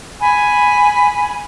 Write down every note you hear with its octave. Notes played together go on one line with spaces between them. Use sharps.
G#5 B5